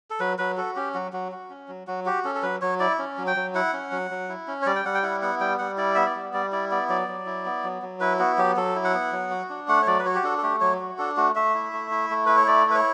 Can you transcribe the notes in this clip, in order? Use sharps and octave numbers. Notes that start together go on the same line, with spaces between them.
A4
F#3 B4
F#3 B4
F#4 A4
C#4 G4
F#3 F#4
F#3 F#4
F#4
C#4
F#3
F#3 F#4
F#4 G4
C#4 A4
A4
F#3 B4
F#3 C#5
E4 D5
C#4
F#3
G5
F#3
E4 F#5
C#4
F#3
F#3
E4
C#4
C#5
G3 D5
G5
G3 F#5
G5
E4 F#5
B3 F#5
G3 G5
G3 F#5
E4 D5
B3 E5
D5
G3
G3 D5
E4 D5
B3 D5
F#3 D5
F#3
E4
B3
F#3
F#3
E4 B4
B3 F#4
F#3 G4
F#3 A4
E4
F#5
B3
F#3
F#4
D4
A3 F#5
C#5
F#3 D5
B4
F#4 C#5
G4
D4 A4
A4
A3 G4
F#3 C#5
F#4
D4 A4
A3 F#4
A3 E5
E4
A3
E4
A3
E4 B4
C#5
A3 D5
E4 B4
C#5